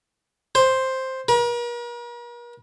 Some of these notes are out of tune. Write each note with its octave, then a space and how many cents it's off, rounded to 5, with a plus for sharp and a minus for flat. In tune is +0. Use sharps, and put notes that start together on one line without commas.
C5 +5
A#4 +45